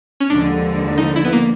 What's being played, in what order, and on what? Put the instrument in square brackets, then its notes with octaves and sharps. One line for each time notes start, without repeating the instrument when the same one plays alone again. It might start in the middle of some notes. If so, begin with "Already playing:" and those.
[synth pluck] C#4
[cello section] D#2 D3 F3 G#3 [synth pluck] D4
[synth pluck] D#4
E4
B3
A#3